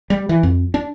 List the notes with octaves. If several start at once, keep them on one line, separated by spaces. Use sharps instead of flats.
G3
E3
F2
D4